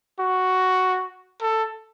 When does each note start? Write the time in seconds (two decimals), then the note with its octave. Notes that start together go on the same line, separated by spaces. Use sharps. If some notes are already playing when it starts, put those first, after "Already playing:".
0.19 F#4
1.41 A4